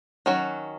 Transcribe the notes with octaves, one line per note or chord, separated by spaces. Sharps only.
D#3 F#3 C#4 F#4